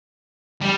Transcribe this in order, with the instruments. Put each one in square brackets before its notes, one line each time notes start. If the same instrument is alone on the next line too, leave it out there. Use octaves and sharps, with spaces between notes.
[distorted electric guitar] G3